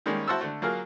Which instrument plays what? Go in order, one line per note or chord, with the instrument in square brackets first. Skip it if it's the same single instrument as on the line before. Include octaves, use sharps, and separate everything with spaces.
[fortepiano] D#3 G3 G#3 A#3 C#4
E4 F#4 C5 A5 E6
D3 A3
F#3 A#3 F4 G#4 A#4